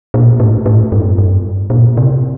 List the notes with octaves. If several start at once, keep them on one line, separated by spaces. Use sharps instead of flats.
A#2
A2
A2
G2
G2
A#2
C3